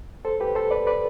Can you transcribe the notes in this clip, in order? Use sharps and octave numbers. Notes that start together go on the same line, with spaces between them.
A4 C5
G4 B4
A4 C5
B4 D5
B4 D5